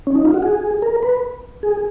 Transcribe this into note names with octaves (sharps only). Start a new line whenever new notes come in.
C#4
D#4
F4
F#4
G#4
A#4
B4
G#4